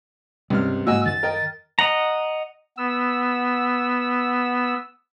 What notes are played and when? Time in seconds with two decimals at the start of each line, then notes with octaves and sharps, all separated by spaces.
0.50 C#2 G2 C3 G3 F6
0.87 G#2 G#3 A#3 F#4 D#5 G#5 E6
1.06 F#2 D#3 A6
1.23 A#4 D#5 G5
1.79 D#5 F#5 A#5
2.77 B3 E6